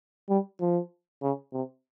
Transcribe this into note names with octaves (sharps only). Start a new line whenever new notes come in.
G3
F3
C#3
C3